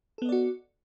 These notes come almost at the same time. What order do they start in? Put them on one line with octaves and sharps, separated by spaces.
A4 B3 D#5 D5 F#4